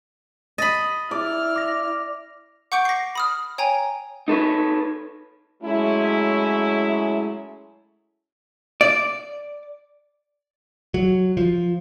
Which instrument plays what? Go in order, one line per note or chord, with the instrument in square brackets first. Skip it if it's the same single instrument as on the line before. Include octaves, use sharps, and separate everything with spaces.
[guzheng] D#5 B5 [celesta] A6
[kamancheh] E4 F6 [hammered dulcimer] D5
[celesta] D6 A#6
[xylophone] F#5 C#6 D6 G6 C#7 D7
A#6 C7
B5 D#6 F6
C#5 G5 G#5 A#5
[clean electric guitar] D#4 A4 B4 C#5
[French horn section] F#3 G#3 A3 C#4 E4
[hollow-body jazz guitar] D5
[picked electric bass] F#3
F3